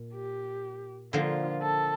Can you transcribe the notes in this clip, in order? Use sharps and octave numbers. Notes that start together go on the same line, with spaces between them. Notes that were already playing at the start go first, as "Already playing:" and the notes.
Already playing: A#2
G4
D3 F3 A#3 F4
A4